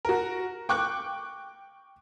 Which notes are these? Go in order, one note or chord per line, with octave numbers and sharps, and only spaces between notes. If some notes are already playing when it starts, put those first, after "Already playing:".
F#4 A#4
G5 C#6 D6 F#6